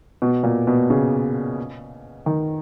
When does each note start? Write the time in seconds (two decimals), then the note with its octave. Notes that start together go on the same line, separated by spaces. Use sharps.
0.22 B2
0.43 A#2
0.67 B2
0.90 C#3
2.26 D#3